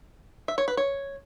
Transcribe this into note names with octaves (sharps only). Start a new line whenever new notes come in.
E5
C#5
B4
C#5